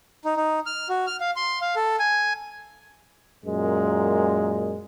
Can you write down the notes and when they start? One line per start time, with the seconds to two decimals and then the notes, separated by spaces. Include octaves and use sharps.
0.25 D#4
0.36 D#4
0.66 F6
0.89 F#4
1.07 F6
1.20 F5
1.36 C6
1.61 F5
1.76 A4
1.99 G#5
3.44 F#2 A#2 G#3